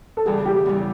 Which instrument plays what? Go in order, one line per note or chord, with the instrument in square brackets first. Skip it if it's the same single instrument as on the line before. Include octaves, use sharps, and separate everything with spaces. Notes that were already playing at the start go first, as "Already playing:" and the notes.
[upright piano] A4
[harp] E2 C#3 E3 G3 [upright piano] G#4
[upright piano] G4
[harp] E2 C#3 E3 G3